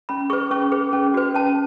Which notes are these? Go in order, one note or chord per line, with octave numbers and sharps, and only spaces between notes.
C#4 B5
G#4 B4 C#6
C#4 C#6
G#4 B4
C#4
F#4 B4
C#4 A5